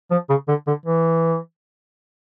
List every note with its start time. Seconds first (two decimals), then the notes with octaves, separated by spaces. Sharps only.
0.11 F3
0.29 C#3
0.48 D3
0.67 D3
0.86 E3